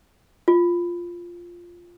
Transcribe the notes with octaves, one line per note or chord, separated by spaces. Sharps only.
F4